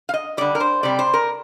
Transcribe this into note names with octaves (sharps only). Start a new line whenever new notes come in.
F5
D#5
D3 G3 D5
A#4
C5
C3 G3 D5
C5
A#4